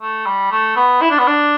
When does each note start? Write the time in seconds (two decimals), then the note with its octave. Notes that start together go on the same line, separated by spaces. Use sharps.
0.02 A3
0.26 G3
0.52 A3
0.76 B3
1.02 E4
1.10 D4
1.19 B3
1.27 D4